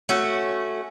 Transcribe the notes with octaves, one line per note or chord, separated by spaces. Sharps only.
A3 C#4 F#4